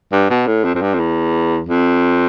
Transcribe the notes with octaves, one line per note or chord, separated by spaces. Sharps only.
G2
B2
A2
F2
F2
G2
F2
E2
F2